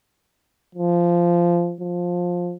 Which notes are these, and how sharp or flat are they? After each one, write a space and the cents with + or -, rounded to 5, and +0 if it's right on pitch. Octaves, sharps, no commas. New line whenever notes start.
F3 -15
F3 +15